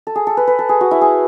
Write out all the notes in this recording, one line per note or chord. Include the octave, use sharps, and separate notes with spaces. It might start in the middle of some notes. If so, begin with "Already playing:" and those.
A4
G#4
A4
B4
B4
A4
G#4
F#4
E4
G#4